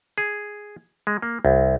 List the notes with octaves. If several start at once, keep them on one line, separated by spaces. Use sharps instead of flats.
G#4
G#3
A#3
C2